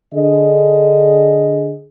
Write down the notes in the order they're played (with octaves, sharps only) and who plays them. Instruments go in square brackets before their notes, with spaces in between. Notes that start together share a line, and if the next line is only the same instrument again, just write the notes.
[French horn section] D3 G#4 D#5